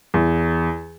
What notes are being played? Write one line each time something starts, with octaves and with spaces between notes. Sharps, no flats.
E2